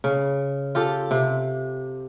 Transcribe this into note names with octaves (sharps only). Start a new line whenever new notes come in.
C#3
F4 G4 A4
C3